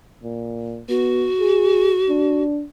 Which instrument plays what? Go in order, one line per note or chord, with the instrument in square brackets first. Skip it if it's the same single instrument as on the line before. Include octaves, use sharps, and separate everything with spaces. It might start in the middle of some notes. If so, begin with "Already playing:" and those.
[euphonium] A#2
[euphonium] B3 [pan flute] F#4
[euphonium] G#4
D4